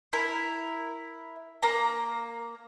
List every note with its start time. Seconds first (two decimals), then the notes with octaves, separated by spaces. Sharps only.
0.13 E4 A#4
1.62 A#3 A#5